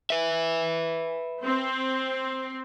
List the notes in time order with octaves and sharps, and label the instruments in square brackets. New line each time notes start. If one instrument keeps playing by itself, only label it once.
[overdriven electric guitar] B4 E5
[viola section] C4